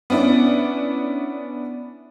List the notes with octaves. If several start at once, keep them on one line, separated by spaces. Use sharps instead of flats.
B3 C#4 D4 E4